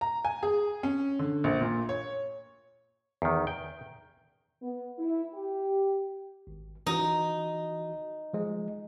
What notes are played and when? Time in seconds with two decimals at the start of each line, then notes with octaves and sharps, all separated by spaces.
0.01 A#5
0.25 G#5
0.43 G#4
0.83 C#4
1.19 D3
1.44 A#1
1.61 A#2
1.89 C#5
3.22 E2 D#3
3.47 G5
4.62 B3
4.98 E4
5.34 G4
6.47 G#1
6.86 E3 D#4 F#4
8.33 F3 G#3